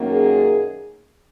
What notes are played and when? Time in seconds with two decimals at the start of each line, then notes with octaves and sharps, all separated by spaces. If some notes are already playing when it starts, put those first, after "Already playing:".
Already playing: F#2 D#3 A#3 C#4
0.10 G#4